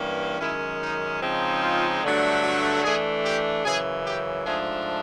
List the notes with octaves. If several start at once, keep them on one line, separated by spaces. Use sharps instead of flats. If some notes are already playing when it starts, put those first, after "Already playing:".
Already playing: G2 E3 G3 A#3 C#4
F#2 D#3 G#3 C#4 E4
D#4
C#3 F3 G#3 C4 D#4
F4
G2 D3 F#3 A3 D4
F#4
E3 A3 D4 G#4
G4
F#2 C#3 E3 G#4
G4
G#2 F3 A3 D4 G#4